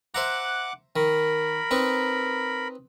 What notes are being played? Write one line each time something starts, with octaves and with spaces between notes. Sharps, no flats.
C5 E5 F#5 A#5 D6 F#6
D#3 A#4 B5
C4 D#4 B4